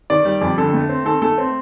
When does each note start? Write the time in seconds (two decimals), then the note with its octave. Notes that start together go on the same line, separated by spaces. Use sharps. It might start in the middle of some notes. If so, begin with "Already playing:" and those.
0.10 D#3 D5
0.25 G3
0.41 F2
0.58 D3 A4
0.74 A3
0.89 C4
1.05 D#3 A4
1.22 A3 A4
1.38 C4